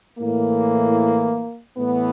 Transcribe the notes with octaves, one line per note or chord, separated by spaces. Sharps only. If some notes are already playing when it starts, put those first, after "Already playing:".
A2 E3 A#3
A2 E3 B3